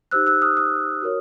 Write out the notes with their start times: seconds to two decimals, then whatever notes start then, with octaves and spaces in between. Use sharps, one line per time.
0.11 D#4 G4 C5 E6 F#6
0.27 E6 F#6
0.42 D#6 F6
0.57 D#6 F6
1.02 F#4 A#4 C#5